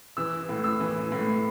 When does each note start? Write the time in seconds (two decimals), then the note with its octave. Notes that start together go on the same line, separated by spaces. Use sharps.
0.17 E3 E6
0.49 A2
0.64 E6
0.80 E3
1.12 A2